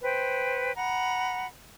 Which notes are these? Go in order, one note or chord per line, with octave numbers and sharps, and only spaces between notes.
B4 C5 G5
F#5 A#5 B5